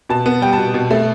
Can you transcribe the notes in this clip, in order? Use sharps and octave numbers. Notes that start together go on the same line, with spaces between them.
B2 A5
B3
G3 G5
A5
B2
B2
A3